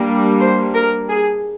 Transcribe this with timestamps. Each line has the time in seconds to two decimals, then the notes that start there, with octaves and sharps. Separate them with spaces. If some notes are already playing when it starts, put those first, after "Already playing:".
Already playing: G3 A#3 D4
0.40 C5
0.74 A#4
1.09 G#4